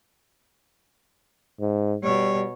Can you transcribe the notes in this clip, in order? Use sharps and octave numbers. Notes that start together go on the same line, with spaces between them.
G#2
B2 G3 C#5